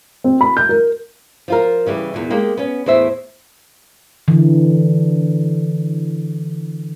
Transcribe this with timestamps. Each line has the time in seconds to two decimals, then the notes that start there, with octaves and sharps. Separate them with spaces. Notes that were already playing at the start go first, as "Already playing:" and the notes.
0.24 C4
0.41 B5
0.57 G6
0.69 A#4
1.48 F3 F4 A#4
1.86 C#3 E3 G3
2.14 E2 A#2
2.30 G#3 A#3 G4
2.58 B3 C#4
2.86 E2 A2 C5 E5
4.28 D3 E3